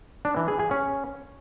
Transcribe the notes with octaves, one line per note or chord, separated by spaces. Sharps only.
D4
E3
G#4
G#4
C#4